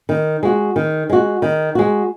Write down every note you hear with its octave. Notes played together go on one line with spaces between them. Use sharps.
D#3
G#3 F#4
D#3
G#3 F#4
D#3
G#3 F#4